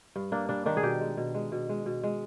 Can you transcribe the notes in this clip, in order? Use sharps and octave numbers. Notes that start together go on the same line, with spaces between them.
G2
A#3 D4
G3 D4
D#3 D4
G#4
B2 G4
G#3
B2
G#3
B2
G#3
B2
G#3